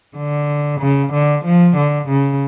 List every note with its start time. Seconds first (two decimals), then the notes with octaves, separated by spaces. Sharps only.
0.16 D3
0.80 C#3
1.13 D3
1.45 F3
1.76 D3
2.08 C#3